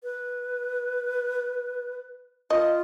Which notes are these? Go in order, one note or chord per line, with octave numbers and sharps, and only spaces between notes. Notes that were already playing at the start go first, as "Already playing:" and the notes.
B4
F4 D#5